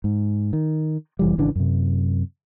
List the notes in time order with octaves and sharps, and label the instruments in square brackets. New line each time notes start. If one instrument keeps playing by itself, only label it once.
[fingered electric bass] G#2
D#3
F1 E3 G3
G#1 C#3 E3 D4
F#2 C3